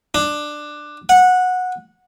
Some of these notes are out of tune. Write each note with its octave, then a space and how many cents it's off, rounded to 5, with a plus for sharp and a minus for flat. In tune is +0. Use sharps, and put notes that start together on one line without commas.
D4 +15
F#5 -15